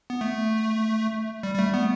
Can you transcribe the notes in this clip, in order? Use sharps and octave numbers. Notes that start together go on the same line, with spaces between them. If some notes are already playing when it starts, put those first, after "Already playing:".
B3
A3
G3
G3
A3
B3